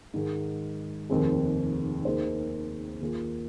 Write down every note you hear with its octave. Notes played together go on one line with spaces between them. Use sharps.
G#2 D#3 G#3
F1 D#2 D#3 C4 G#4
D#2 D#3 A#3 G#4 C5
D#2 D#3 A#3 F4 G#4